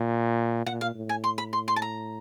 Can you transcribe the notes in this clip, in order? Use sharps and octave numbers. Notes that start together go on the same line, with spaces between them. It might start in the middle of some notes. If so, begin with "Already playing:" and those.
Already playing: A#2
A#2 F#5
F5
A2
G#5
C6
B5
C6
C6
A5
A#5